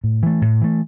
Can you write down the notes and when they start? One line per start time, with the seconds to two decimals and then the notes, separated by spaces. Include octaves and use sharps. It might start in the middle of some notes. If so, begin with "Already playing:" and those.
0.04 A2
0.23 E3 A3
0.42 A2
0.62 E3 A3